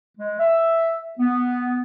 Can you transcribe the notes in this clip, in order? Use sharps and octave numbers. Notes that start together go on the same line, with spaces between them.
G#3
E5
B3